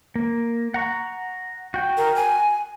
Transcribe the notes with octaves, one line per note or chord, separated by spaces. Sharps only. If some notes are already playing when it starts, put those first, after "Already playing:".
A#3
F#5 A#5 C#6
F#4 G5
A#4
G#5